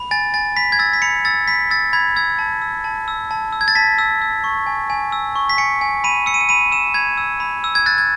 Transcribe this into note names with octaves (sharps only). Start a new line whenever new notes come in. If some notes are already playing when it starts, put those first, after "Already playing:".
Already playing: B5
G#5 A6
G#5 A6
B5 B6
G#6
E6 A6
B6
B5 C#7
E6 A6
B5 B6
E6 A6
B5 G#6
E6 G#6
A5
E6
A5
E6
A5
E6
G#6
A6
A5 B6
E6
E6
C#6
G#5
G#5
E6
C#6
B6
G#5 C#7
G#5
B5 D#7
E6 C#7
D#7
C#7
B5 D#7
E6 E7
B5 G#6
E6
B5
E6
G#6
F#6 A6
G#6